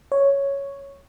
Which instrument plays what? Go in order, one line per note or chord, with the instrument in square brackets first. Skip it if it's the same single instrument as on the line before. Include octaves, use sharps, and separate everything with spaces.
[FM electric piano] C#5